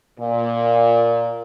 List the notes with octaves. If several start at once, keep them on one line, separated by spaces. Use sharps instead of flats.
A#2